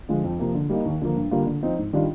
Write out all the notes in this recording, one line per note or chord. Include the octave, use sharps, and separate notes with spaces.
D3 F3 G#3
F2
C3 F3 A#3
D3
G3 A#3 D#4
D#2
D3 F3 A#3
G2
D3 G3 A#3 F4
D3
F3 C4 D#4
G#2
D#3 G3 D4 F4